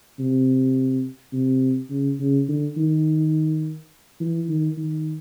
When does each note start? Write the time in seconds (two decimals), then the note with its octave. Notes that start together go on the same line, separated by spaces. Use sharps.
0.19 C3
1.33 C3
1.90 C#3
2.19 C#3
2.48 D3
2.77 D#3
4.20 E3
4.49 D#3
4.77 D#3